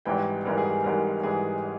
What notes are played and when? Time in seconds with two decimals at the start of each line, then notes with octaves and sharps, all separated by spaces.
0.05 G#1 G#2 E3 G3 G5
0.45 G#1 G#2 E3 G3 A#4
0.57 G#4
0.70 G#4
0.84 G#1 G#2 E3 G3 A#4
1.23 G#1 G#2 E3 G3 G#4